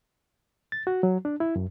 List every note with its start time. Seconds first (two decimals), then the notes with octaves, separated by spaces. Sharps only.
0.72 A6
0.87 F#4
1.03 F#3
1.25 D4
1.40 E4
1.56 F#2